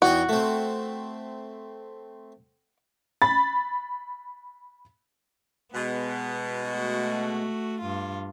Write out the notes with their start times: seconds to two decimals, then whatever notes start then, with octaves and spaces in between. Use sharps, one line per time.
0.02 E2 D#4 F#4 G5
0.29 A3 C4
3.22 B5 A6
5.75 B2 G#3 B3
6.70 A3 F#4
7.81 G2 F4